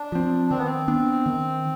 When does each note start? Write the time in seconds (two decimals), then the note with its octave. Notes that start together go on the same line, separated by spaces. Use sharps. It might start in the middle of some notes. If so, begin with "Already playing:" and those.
Already playing: D4
0.12 F3 C4
0.50 D#3 C4
0.59 B3
0.67 C4
0.88 B3 D4
1.26 D#3